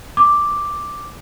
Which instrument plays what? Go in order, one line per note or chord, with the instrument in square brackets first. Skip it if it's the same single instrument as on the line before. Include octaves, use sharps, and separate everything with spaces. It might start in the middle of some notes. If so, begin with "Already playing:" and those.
[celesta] D6